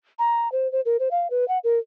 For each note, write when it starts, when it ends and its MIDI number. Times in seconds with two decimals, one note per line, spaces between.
0.19 0.51 82
0.52 0.70 72
0.72 0.81 72
0.85 0.97 70
1.00 1.09 72
1.11 1.28 77
1.31 1.47 71
1.48 1.58 78
1.64 1.79 70